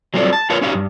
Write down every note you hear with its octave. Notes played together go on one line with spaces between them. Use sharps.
F#3 G3 C4 F4 A4 D5
A5
F4 A#4 B4 C#5 F5
C#4 D#4 F#4 G4 F5
G2